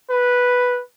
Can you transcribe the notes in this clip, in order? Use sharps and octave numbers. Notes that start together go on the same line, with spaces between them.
B4